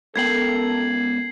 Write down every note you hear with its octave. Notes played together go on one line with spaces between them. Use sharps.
C#2 B3 A4 A#4 G5 G#6 C7 F#7